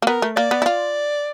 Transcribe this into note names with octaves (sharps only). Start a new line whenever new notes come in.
A#3
B3 A#4
A3
A#3 D5
B3
E4
F4